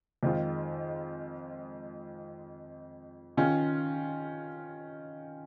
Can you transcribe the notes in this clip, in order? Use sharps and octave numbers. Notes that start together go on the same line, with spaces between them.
F2 D#3 G#3 F4
D#3 C#4 F4